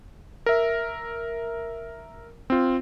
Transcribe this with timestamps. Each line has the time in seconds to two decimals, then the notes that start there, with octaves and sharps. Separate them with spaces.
0.46 A#4 E5
2.50 C4 F4